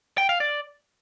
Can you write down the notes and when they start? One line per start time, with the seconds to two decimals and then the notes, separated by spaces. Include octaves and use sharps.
0.18 G5
0.29 F5
0.40 D5